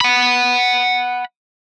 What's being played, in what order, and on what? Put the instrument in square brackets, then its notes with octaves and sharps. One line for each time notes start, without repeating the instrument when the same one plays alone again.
[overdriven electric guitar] F#5 B5